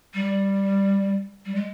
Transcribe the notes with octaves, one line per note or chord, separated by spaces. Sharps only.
G3
G3
G#3